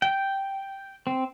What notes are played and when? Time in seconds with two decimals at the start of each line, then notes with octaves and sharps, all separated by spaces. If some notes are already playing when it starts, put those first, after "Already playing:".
0.02 G5
1.07 C4